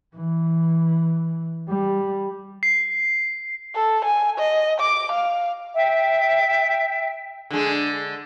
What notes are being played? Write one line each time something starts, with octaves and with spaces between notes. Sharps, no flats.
E3
G3
C7
A4
G#5
D#5
D6
F5
E5 G5
D3 G#3